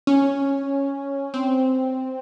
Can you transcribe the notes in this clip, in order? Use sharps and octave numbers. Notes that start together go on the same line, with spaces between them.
C#4
C4